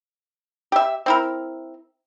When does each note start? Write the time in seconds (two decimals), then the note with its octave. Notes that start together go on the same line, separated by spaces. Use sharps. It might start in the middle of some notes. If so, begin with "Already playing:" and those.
0.72 G4 E5
1.06 C4 E4 A#4